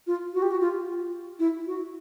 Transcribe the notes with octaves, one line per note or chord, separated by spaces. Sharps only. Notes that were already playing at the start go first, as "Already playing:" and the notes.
F4
F#4
G4
F#4
F4
E4
F#4